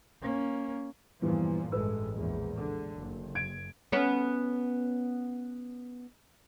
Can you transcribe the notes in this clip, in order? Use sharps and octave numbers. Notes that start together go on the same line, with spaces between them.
A#3 C#4
E2 G2 A#2 E3 F3
A1 G2 G#3 A4 B4 E6
A#1 E2 G#3
D3
F#1
G#6 D7
B3 C#4 B4